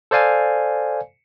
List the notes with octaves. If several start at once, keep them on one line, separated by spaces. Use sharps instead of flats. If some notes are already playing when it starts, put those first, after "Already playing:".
A4 C5 D5 F5 G#5